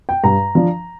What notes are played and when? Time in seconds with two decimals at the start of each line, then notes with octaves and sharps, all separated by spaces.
0.09 G5
0.24 G2 A#5
0.55 F3 D4